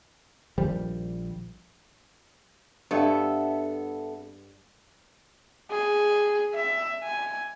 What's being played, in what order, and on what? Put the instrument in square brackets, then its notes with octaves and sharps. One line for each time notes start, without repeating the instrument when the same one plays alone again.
[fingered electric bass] A#1 D#3 F3 G3
[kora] G2 [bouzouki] B3 A4 E5
[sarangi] G#4
E5
G#5